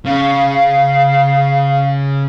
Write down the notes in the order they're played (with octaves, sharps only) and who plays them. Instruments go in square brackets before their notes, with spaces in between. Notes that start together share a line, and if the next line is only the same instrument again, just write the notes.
[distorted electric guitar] C#3 [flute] F5